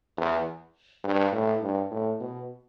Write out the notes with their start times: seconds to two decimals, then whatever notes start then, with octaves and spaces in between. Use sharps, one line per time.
0.18 E2
1.04 G2
1.33 A2
1.63 G2
1.91 A2
2.21 B2